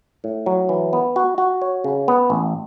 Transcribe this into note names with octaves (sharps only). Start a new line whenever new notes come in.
A2
F#3
E3
B3
F#4
F#4
C#5
C#3
B3
A1